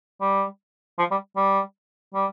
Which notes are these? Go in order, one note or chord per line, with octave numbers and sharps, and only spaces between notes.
G3
F3
G3
G3
G3